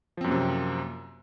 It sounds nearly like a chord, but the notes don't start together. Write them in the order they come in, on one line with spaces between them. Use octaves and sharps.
F3 C4 F#2 A#3 C3